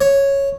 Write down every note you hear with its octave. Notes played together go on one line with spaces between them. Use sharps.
C#5